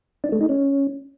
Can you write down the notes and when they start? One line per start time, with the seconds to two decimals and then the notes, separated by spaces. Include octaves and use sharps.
0.24 D4
0.32 A3
0.41 D#4
0.49 C#4